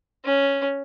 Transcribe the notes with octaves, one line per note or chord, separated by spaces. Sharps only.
C#4